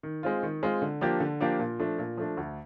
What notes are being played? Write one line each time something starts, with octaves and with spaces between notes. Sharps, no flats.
D#3
G#3 C4 F4
D#3
G#3 C4 F4
D3
F3 A#3 D4 G4
D3
F3 A#3 D4 G4
A#2
F3 A3 D4
A#2
F3 A3 D4
D2